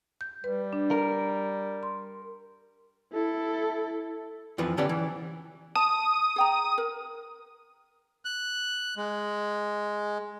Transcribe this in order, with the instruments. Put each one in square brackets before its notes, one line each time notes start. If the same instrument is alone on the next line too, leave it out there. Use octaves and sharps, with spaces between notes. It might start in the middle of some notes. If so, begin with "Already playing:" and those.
[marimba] G6
[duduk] G3 [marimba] B4
[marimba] D4
[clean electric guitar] A#4
[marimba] C6
[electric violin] E4 A4
[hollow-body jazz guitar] F2 E3 F3 B4
D3 B3 C#4 G4 D5
E3
[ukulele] A5 [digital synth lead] D#6
[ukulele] G#4 G5 A#5
A#4
[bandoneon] F#6
G#3